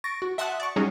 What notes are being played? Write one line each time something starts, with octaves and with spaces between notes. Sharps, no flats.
C#6 A6 A#6 D7
F#4
E5 F#5 A5 C6 D#6 F#6
D5 C#6
F#3 G3 C#4 D#4 F#4 G#4